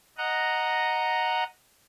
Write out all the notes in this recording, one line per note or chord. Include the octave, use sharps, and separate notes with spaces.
D#5 F#5 A#5